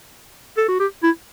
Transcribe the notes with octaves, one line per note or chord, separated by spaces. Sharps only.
A4
F#4
G4
E4